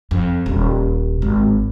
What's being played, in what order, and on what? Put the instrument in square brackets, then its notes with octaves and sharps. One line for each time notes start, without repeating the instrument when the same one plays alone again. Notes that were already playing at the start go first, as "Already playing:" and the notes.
[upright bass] F2
D#1
G#1